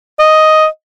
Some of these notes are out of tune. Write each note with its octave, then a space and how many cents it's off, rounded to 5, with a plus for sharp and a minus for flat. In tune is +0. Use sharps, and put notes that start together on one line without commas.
D#5 +5